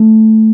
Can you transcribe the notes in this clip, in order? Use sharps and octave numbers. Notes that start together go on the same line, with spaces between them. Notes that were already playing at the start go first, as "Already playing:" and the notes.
Already playing: A3